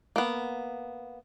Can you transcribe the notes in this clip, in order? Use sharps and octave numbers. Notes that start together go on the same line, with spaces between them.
A#3 B3